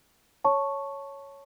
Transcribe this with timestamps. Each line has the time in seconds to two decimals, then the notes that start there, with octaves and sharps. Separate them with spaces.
0.45 C#5 A5 C#6